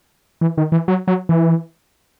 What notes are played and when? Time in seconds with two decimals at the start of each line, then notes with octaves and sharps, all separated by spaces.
0.41 E3
0.58 D#3
0.72 E3
0.88 F#3
1.08 F#3
1.29 E3